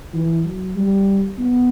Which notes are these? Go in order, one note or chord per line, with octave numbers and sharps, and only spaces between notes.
E3
F#3
G3
B3